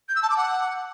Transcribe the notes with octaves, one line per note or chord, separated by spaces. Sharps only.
G6
E6
A5
D6
F#5